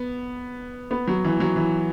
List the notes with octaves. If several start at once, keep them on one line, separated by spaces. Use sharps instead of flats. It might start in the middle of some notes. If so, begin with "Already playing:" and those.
Already playing: B3
B3
F#3
E3
F#3
E3